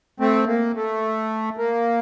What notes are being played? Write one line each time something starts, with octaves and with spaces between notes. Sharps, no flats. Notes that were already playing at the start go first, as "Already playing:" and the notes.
A3 C4
A#3
A3
A#3